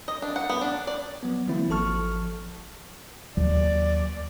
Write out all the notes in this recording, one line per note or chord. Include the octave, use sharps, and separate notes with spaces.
D#5
D4
F#5
B3
D4
D5
F#3 B3
D3 E3 F#3 A#3 C4 E4
G#1 F3 A4 A5 C#6 F6
D#2 F#3 D5